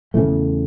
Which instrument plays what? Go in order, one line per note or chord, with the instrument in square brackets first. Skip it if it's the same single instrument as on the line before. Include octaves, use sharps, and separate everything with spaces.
[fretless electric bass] E2 C#3 E3 A3